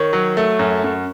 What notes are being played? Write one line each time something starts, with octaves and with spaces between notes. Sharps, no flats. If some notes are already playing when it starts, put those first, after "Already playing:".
Already playing: D#3 C#5
F#3
A3
F#2
F#2